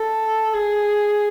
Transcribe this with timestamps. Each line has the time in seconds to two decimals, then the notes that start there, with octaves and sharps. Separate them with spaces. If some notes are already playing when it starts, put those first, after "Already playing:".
Already playing: A4
0.54 G#4